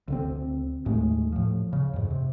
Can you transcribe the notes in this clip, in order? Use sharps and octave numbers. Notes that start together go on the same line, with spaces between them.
D2 D3 C4
D#2 A2 G#3 A3
A2 F3
C#3
F2 G#2
C3